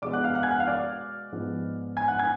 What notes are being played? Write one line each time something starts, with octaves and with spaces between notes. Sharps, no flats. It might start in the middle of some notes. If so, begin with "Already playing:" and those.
B2 G#3 B3 D5 D6
F#5 F#6
F5 F6
F#5 F#6
G#5 G#6
F#5 F#6
F5 F6
D5 D6
G#2 F3 G#3 B3
G#5 G#6
F#5 F#6
G#5 G#6